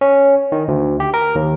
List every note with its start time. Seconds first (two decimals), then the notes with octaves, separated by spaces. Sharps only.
0.01 C#4
0.52 D#3
0.68 D2
1.00 G4
1.14 A#4
1.35 D#2